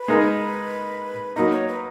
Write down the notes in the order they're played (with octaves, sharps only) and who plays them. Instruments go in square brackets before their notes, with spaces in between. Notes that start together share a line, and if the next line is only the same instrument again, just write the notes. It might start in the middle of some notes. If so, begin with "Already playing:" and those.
Already playing: [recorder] B4
[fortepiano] G#3 D#4 A#4
[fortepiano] F#3 A#3 D#4 [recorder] B4
[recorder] C#5
B4